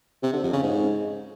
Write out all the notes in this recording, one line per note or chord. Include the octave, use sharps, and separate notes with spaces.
C3
D3
F2
C#3
G#2